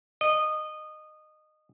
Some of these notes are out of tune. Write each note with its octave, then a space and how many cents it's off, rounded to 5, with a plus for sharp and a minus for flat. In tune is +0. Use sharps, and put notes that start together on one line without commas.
D#5 -20